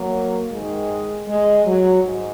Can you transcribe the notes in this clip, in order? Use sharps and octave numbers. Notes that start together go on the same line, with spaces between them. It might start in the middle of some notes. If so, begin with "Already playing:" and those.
Already playing: F#3 A#3
G#2 D#3 G#3
G#3
F#3
G#2